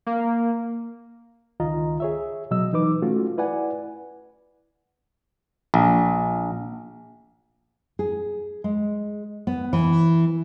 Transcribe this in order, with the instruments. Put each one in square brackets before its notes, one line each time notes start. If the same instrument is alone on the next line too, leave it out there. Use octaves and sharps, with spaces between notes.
[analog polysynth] A#3
[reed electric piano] C#2 D#3 F4 D#5 A#5
G#4 C#5 E5
B2 F#3 D#5 E6
E3 D#4 B4 D6
A3 C#4 F4 F#4
E4 B4 D5 F#5 G#5
[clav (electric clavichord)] A#1
[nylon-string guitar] G#4
G#3
B3
E3